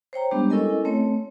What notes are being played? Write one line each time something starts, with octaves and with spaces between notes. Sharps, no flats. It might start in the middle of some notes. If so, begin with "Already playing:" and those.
C5 C#5 G5 A#5
G3 G#3 B3 D4 G4
C#4 E4 A4 A#4 D#5 G#5
A3 C4 C#5